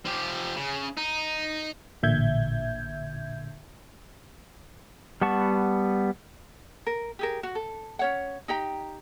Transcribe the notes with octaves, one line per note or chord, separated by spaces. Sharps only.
F3 G4
C#3
D#4
A1 A#2 D3 E5 G6 G#6
G3 B3 F#5 A5 C#6
A#4
G4 G#4 A#4
F#4
A4
C#4 C#5 F#5
D#4 G4 G5 A#5